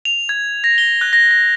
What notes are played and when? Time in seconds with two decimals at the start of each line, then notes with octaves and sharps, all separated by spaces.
0.05 F7
0.29 G#6
0.64 A#6
0.78 G7
1.01 F#6
1.13 A#6
1.31 A#6